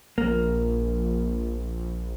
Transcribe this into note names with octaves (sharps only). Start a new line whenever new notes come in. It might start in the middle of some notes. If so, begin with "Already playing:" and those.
A#1 A#3